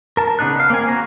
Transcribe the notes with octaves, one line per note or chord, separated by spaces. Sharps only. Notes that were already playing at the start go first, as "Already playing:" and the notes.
A#4 A5
C#3 B3 D4 D#4 F#6
B3 F5
A#3 C4 G#5
F#4 A#5